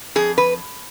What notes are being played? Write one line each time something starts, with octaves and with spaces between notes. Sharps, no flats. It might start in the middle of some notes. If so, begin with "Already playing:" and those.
F2 G#4
B4